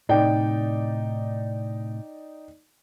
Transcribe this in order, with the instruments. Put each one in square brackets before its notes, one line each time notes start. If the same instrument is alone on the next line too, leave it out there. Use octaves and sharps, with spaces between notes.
[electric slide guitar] A2 C3 [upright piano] D#4 D5 G5